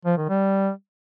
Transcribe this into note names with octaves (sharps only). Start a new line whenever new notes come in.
F3
D#3
G3